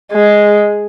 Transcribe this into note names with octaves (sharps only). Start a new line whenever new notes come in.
G#3